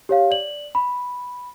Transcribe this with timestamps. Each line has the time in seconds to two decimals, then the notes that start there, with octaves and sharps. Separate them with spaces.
0.09 G4 C#5 F5
0.31 D5 F#7
0.75 B5